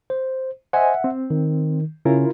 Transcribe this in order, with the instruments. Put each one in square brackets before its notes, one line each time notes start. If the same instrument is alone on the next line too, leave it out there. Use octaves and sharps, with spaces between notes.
[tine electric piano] C5
[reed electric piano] C5 D#5 G#5 [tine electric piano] E5 F#5
[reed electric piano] C4
[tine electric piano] D#3
[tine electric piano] C#3 C#4 [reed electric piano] E4 F4 A#4